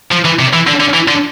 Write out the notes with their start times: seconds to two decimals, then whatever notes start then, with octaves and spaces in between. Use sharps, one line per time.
0.12 F3
0.25 E3
0.40 C3
0.53 E3
0.67 D3
0.80 D3
0.94 E3
1.08 D3